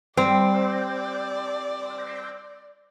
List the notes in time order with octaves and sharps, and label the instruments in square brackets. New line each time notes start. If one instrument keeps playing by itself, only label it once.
[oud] G3 [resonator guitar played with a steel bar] C4 [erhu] D5